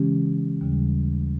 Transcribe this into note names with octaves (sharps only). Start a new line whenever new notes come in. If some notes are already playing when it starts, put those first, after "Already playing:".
Already playing: C#3 E3 G#3 C#4 G4
D#2 C#3 G3